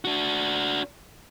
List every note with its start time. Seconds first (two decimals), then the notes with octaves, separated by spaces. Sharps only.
0.05 D4 F#4